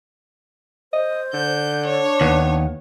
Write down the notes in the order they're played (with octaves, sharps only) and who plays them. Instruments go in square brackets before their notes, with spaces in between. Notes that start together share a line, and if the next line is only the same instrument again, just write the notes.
[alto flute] C5 [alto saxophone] D#5
[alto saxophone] D3 [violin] G6
[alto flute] D4 [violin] C#5
[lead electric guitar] D#2 [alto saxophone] B3